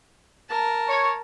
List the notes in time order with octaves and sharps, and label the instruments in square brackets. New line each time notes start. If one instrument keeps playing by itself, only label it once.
[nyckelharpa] A#4 A5
[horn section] C#5